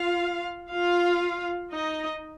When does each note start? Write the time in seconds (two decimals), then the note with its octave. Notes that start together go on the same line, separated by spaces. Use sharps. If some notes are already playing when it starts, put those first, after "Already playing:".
Already playing: F4 F5
0.71 F4 F5
1.72 D#4 D#5